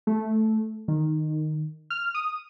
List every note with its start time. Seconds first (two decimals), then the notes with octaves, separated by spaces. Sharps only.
0.07 A3
0.88 D#3
1.90 F6
2.14 D#6